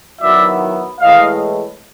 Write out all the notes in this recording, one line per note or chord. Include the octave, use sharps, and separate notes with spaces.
D#3 F#3 B3 E4 D5 E5
A2 E3 G#3 D#5 F5